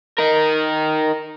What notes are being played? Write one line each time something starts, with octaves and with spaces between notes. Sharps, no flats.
D#4 A#4